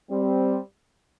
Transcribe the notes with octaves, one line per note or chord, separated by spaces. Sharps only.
G3 C4